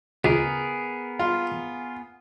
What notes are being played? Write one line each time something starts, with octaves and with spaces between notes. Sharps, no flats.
C#2 B3 G#4 A#4
F4